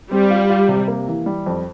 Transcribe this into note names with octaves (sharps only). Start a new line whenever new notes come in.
G3 C4
F4
F4
C3
A#3
E3
G3
F2